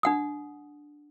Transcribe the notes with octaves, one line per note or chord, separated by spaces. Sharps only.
D4 F#5 D#6